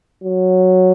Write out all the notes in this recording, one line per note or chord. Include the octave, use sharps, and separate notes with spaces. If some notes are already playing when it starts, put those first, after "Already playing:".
F#3